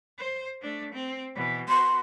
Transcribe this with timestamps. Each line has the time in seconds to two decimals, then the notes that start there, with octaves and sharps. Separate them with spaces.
0.18 C5
0.62 A3 D4
0.93 C4
1.35 B2 E3
1.69 B3 F#4 C6